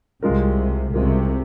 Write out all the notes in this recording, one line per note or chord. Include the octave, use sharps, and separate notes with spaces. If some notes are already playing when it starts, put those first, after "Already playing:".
C2 C3 G#3 F4 A#4
C2 C3 G#3 F4 A#4